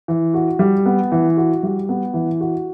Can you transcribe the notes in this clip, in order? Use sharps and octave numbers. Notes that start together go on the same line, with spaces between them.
E3
F#4
G3
B3
E3
F#4
G3
B3
E3
F#4